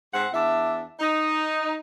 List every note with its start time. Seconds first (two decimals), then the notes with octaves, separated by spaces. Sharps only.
0.13 G#2 C4 F#5
0.33 E2 D4 E5
1.00 D#4